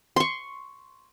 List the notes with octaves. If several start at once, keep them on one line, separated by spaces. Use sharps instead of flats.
C6 C#6